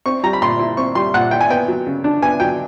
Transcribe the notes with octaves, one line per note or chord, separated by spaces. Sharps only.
C4 C#6
G3 A#5
B5
A#2 C6
E4
C4 C#6
G3 C6
A#2 F#5
E4 G5
G#5
B3 G5
F#3
C#3
D4
B3 G#5
F#3 G5